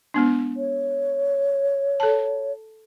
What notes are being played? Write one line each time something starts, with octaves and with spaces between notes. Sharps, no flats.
G#3 B3 D4
C#5
A4 A5